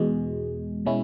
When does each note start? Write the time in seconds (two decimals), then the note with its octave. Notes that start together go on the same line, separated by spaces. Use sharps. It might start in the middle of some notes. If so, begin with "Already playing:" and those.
Already playing: E2 B2 G#3
0.86 B2 G#3 C#4 E4